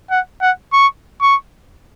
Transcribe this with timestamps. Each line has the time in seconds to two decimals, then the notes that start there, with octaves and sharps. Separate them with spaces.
0.11 F#5
0.42 F#5
0.73 C#6
1.21 C#6